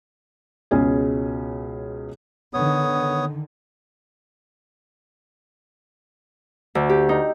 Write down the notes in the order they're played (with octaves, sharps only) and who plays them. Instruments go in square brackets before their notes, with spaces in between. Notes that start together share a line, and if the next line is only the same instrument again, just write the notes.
[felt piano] C#2 B2 C#4 G#4 G#5
[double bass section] D3 D#3 [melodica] B3 C#5 D#6
[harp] D2
G4
D#4